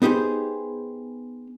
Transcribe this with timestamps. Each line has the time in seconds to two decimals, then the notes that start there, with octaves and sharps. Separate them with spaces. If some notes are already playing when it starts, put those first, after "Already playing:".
0.02 B3 D#4 G4 G#4 C5